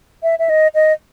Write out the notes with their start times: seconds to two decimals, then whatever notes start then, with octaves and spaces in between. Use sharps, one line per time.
0.23 E5
0.39 E5
0.49 D#5
0.75 D#5